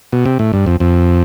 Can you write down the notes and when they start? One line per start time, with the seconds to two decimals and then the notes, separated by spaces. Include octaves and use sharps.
0.12 B2
0.25 C3
0.39 A2
0.53 G2
0.66 F2
0.80 F2